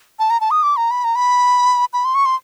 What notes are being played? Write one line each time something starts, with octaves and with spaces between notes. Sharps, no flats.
A5
A#5
A5
D#6
D6
A#5
B5
A#5
B5
B5
C6
C#6
C6